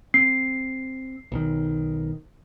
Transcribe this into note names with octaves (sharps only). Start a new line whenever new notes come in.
C4 C7
B1 D#3